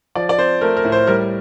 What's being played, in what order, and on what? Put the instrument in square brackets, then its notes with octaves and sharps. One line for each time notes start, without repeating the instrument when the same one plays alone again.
[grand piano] F3 D5
D5
C4 C5
A3 A#4
A#4
A2
C5
G3 A#4